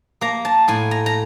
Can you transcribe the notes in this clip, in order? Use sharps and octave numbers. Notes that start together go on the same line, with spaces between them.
A#3 A#5
A5
A2 G#5
A#5
A#5